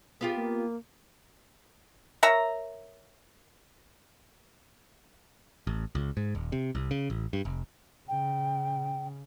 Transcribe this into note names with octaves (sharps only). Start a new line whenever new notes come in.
B3 F4 G4 G#4
A#3
A#4 C#5 E5 A#5
A1
C#2
G#2
D#1
C3
C2
C#3
A1
G2
F1
C#3 G5